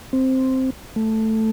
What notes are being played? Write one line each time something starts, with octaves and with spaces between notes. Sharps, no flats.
C4
A3